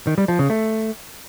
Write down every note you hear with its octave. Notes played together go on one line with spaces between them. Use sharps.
D#3
G3
F3
C#3
A3